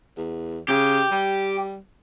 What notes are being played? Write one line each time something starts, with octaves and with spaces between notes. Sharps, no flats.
E2
C#3 G4
G3